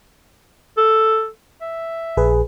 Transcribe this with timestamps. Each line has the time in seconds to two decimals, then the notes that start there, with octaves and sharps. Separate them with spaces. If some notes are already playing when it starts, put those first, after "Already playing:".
0.77 A4
1.61 E5
2.17 A#1 G#4 B4